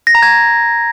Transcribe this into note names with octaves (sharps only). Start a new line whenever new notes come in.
A#6
A#5
G#6